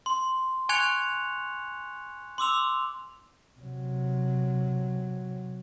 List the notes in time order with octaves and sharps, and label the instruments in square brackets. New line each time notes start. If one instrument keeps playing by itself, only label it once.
[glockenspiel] C6
G#5 C#6 F#6 G#6 C#7 F7
C6 D6 E6 F7
[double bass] C3 F#3